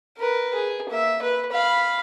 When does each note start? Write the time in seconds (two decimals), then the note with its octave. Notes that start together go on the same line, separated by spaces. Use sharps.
0.18 A#4 B4
0.55 G#4
0.90 A#3 E5
1.22 B4
1.52 F5 B5